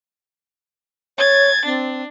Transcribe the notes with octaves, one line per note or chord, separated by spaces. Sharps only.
C#5 G#6 A6
C4 D4